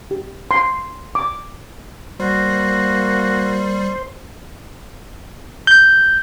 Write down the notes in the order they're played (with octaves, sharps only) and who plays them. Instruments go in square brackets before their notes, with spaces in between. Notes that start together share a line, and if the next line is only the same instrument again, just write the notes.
[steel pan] G4
C6
D6
[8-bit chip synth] G3 [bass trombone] A#3 [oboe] F#4 [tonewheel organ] C5
[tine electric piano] G6